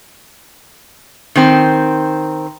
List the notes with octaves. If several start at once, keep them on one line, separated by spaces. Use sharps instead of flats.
D#3 C4